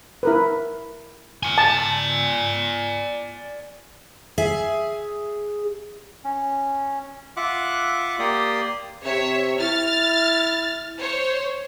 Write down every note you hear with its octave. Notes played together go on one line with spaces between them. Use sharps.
E4 A#4 B4
D5 G#5
A5
G#4 E5
C#4
F4 E5 F#5 D6 F#6
A#3 G4 D5 C6 D#6
C3 C#5 E5
E4 F6 A6
C5 C#5